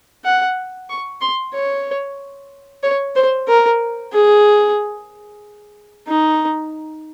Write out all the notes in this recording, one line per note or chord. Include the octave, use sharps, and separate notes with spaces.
F#5
C#6
C6
C#5
C#5
C5
A#4
G#4
D#4